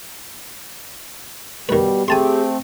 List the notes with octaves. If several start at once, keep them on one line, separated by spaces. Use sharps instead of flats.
B2 D#3 G3 B4
A3 C4 G4 G#4 G#5 A5 C6